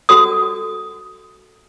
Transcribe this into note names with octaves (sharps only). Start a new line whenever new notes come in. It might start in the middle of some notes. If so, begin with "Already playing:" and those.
F#4 A4 D#6